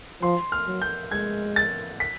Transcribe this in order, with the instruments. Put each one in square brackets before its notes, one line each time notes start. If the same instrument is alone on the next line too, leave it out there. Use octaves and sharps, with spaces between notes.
[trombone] F3 [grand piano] C6
[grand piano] F6
[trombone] F#3
[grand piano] G6
[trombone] G#3 [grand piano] G#6
[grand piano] A6
B6